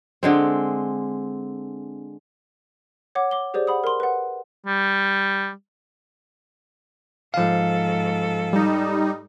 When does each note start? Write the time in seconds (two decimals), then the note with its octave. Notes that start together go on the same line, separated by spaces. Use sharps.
0.23 D3 G#3 C4
3.15 C#5 F#5 D6
3.31 D6 G7
3.54 G4 G#4 C5 D5
3.67 F#5 B5 D#6
3.84 A#4 C6
4.00 B4 F#5
4.67 G3
7.34 G#2 F3 A4 F5
8.53 G3 D#4